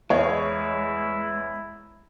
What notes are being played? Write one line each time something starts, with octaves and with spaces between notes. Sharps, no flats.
E2 G#3 E4 C#5 D#5